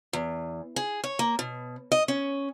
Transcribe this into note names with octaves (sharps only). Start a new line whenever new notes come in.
E2
G#4
C#5
A#3
B2
D#5
C#4